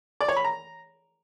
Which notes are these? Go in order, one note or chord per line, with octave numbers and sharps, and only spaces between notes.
D5
C#5
B5
A#5